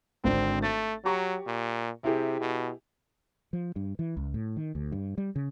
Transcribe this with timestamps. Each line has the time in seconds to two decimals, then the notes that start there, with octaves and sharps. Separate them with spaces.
0.24 G#1 D3 C4 D4
0.62 A3 A6
1.05 F#3 G4 A#5 C#6
1.47 A#2
2.04 C3 E4 G4 G#4
2.41 B2
3.53 F3
3.76 G2
3.99 E3
4.17 C#2
4.34 A2
4.57 D#3
4.75 D2
4.92 G2
5.18 G3
5.36 C#3